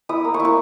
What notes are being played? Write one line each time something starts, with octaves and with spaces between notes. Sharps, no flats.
E4 D#6
A#3
C#6
E4
C#6